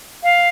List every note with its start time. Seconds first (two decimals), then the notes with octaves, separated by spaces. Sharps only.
0.24 F5